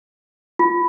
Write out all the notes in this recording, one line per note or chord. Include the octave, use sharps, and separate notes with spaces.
F4